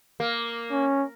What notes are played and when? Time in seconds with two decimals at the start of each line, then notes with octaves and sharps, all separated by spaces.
0.20 A#3
0.71 C#4